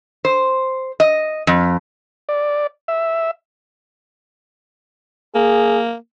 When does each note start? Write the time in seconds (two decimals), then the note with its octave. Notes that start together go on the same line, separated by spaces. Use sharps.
0.25 C5
1.00 D#5
1.47 F2
2.29 D5
2.88 E5
5.35 A#3 G#4